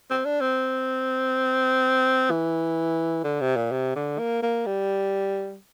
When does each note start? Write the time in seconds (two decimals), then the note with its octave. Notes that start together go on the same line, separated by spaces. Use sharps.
0.11 C4
0.25 D4
0.41 C4
2.31 E3
3.24 D3
3.41 C3
3.56 A#2
3.72 C3
3.96 D3
4.19 A#3
4.43 A#3
4.66 G3